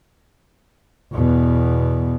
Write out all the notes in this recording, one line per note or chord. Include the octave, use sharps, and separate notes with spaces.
E2 B2